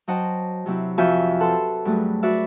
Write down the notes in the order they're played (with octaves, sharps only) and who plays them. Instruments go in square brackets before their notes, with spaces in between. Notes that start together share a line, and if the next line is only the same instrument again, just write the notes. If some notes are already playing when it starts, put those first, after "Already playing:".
[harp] F#3 C5 D#5 F#5 G5 A5
C3 F#3 C4 E4
F2 F3 F#4 E5 G#5 G6
A4 B4 F#5 A5 C6
G2 F#3 A3 G#4
F#4 B4 D5 E5